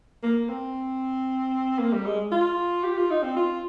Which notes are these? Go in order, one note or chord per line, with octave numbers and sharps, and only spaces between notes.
A#3
C4
A#3
G3
G#3
F4
G4
F4
D#4
C4
F4